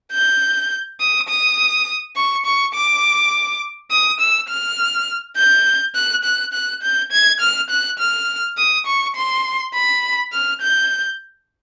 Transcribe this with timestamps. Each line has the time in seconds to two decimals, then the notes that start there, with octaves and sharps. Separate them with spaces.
0.12 G6
1.00 D#6
1.29 D#6
2.16 C#6
2.45 C#6
2.74 D6
3.91 D#6
4.20 E6
4.49 F6
5.37 G6
5.95 F#6
6.24 F#6
6.53 F#6
6.82 G6
7.12 G#6
7.40 F6
7.70 F#6
7.99 F6
8.57 D#6
8.86 C#6
9.16 C6
9.74 B5
10.33 F6
10.61 G6